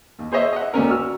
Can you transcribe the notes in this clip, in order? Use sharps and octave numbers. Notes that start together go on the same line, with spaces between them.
D#2
G#4 C5 C#5 D#5 E5
D#5 E5 F#5
D2 A3 C#4 A#4
F#4 E6 F6